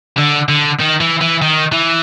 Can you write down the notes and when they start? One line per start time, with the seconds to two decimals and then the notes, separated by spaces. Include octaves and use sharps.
0.18 D3
0.49 D3
0.80 D#3
1.01 E3
1.21 E3
1.42 D#3
1.72 E3